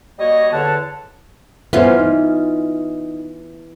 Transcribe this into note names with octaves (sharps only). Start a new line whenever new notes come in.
G3 A#3 F#4 C#5 D#5
E2 D3 C#5 F#5 A5
E3 B3 C#4 F4 C5
D#4